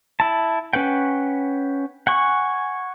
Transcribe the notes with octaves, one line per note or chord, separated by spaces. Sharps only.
E4 A5
C#4 B4 F#5 G5
F#5 G#5 C#6